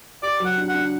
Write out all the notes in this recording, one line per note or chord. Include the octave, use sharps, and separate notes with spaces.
G4 D5
F#3
F#5
D4
F#5
D4